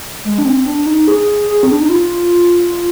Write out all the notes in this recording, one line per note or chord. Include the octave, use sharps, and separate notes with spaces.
G#3
D4
C4
D4
D#4
G#4
G#4
C4
D4
D#4
F4